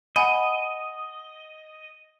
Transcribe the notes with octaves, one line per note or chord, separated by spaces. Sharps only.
D#5 F#5 G#5 B5